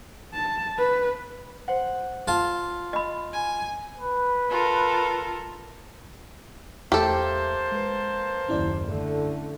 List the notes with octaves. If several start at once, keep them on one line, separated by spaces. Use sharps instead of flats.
A5
B4
C5 F#5
F4 A5
D#5 B5
G#5
B4
F4 A4 A#4
E2 A3 A#3 G4 A4 C5 E5 A5
G#3 B4
F#1 D#2 C#4 E4 D5
D3 A3